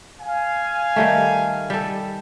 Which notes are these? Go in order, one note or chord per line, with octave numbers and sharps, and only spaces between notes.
F5 G#5
D#3 G3 A3
G3 A4